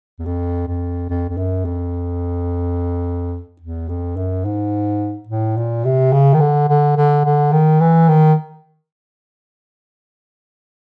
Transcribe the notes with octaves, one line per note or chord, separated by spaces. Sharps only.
E2
F2
F2
F2
F2
F#2
F2
E2
F2
F#2
G#2
A2
A#2
C3
C#3
D#3
D3
D3
D3
D3
D#3
E3
D#3